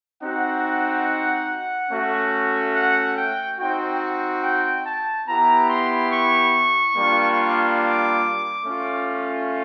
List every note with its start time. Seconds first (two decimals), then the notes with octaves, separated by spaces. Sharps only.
0.22 C4 D#4 F#4 F#5
1.91 A3 C#4 F#4
2.76 F#5
3.17 G5
3.59 C4 D#4 F#4 G5
4.44 G5
4.85 A5
5.28 B3 E4 G4 A#5
5.70 C6
6.12 C#6
6.96 G3 A#3 D4 F4
7.80 D6
8.65 A3 C#4 F4